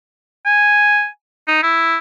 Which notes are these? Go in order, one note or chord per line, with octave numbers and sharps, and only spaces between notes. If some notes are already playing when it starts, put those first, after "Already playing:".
G#5
D#4
E4